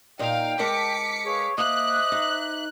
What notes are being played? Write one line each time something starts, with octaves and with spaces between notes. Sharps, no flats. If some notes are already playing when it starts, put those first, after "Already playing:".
A#2 D#4 F5 G5
G#3 A#4 A5 D6 B6 C#7
G#4 B4 C#5 F5
A#3 C5 D#5 E5 D6 F#6
D#4